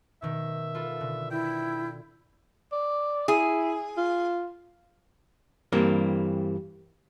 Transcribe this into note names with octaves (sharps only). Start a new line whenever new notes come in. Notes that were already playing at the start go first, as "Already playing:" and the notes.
B2 D#3 E5
F4 A4 B4
B2 D3
E4 G5
D5
E4 G#4
F4
G2 E3 G3 A#3 C4